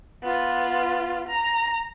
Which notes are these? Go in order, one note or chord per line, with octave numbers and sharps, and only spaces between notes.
B3 F4
A#5